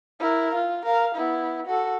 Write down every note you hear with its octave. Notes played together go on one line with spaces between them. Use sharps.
E4 A#4
F4
A#4 F5
B3 E4
F#4 A4